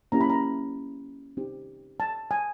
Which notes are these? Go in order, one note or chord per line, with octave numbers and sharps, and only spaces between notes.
A#3 C#4 E4 G4 A#5
B5
A#5
C4 D#4 G4
A5
G#5